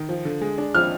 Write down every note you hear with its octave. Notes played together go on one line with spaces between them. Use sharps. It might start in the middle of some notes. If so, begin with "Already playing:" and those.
Already playing: D#3
F3
D3
G#3
D4
F3 F6